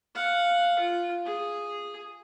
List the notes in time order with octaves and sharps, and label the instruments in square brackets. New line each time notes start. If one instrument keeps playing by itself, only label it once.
[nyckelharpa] F5 F#5
F4
G#4